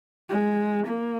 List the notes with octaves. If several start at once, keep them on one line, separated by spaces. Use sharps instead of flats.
G#3
A#3